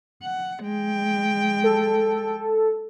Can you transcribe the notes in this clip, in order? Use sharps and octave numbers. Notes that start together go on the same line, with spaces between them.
F#5
G#3 G5
A4